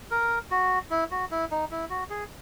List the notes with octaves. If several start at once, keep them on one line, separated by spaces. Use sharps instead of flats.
A#4
F#4
E4
F#4
E4
D#4
E4
F#4
G#4